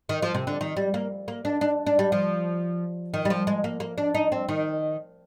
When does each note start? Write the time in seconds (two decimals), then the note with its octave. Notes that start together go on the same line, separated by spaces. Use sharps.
0.09 D#3
0.22 F3
0.35 C3
0.47 D3
0.61 D#3
0.77 G3
0.94 A#3
1.28 A#3
1.45 D4
1.61 D4
1.87 D4
1.99 G3
2.12 F3
3.14 D#3
3.25 G3
3.30 F3
3.47 G#3
3.64 A#3
3.80 A#3
3.98 D4
4.15 D#4
4.32 C4
4.49 D#3